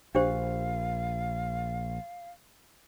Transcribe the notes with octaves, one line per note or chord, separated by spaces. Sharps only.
A#1 D4 G4 C5 F5